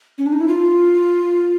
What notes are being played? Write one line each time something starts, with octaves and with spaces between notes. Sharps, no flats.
C#4
D4
D#4
E4
F4